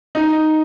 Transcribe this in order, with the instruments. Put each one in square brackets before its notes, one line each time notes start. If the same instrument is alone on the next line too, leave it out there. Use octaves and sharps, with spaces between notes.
[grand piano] D#4